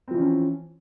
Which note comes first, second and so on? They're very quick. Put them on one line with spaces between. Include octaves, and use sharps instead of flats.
C4 F3 E3 C#4